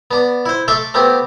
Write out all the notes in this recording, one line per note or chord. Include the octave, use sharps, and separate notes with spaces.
B3 D4
E4 C5
A3 A4 E5 C6 D6
A3 B3 C4 G4